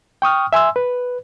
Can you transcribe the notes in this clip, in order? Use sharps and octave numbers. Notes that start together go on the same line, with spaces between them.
G5 C#6 D#6 F6
E5 G#5 C6 E6
B4